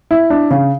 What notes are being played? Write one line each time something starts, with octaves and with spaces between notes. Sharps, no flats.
E4
D4
C#3